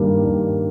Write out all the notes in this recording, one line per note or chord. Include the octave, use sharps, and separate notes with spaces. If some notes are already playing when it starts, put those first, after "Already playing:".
Already playing: G2 D#3 G3 A#3
G2